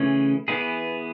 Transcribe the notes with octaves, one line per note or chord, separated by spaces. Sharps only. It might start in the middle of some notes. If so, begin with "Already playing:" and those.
Already playing: C#3 E3 A3 C#4 G#4
E3 B3 E4 G#4